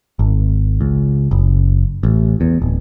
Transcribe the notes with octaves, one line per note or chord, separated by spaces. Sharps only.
G#1
C#2
F#1
A1
E2
D1